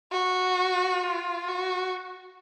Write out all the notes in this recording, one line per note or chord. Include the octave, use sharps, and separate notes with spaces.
F#4
F4
F#4